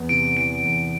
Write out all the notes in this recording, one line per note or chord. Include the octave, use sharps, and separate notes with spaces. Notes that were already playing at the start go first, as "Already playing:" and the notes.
Already playing: E2 E3 B3
C3 D7
E3 D7
E2